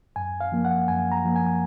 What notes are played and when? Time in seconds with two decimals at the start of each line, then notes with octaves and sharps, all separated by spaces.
0.16 F#2 G#5
0.41 F5
0.52 F3 A#3
0.65 F#5
0.88 F#2 G#5
1.12 A#5
1.24 F3 A#3
1.36 G#5